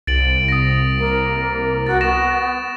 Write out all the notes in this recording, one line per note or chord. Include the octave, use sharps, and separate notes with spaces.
C2 A6 D7 F#7
D#6 A#6
A#3
F#4 A6
B3 C#6 A#6 E7